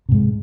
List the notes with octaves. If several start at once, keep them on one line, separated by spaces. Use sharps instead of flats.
G#2 C3 G#3